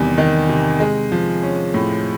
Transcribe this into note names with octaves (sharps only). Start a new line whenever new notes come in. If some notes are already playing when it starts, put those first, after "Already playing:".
Already playing: E2 C3 D#3 G3
D#3
C3
G#3
F3
C#4
A2